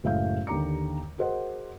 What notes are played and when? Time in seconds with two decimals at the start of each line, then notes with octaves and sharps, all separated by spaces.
0.04 F#1 A2 G#3 E5 F5 G6
0.47 D#2 D3 G4 A#5 D6 C#7
1.18 F#4 G#4 A#4 C5 D#5 F#5